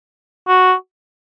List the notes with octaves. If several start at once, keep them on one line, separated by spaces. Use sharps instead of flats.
F#4